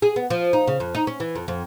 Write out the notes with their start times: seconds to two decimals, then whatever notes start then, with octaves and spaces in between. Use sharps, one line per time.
0.02 G#4
0.16 B3
0.30 F3
0.53 D#4
0.67 C#3
0.80 F2
0.95 D#4
1.07 C#4
1.20 E3
1.35 F2
1.48 F2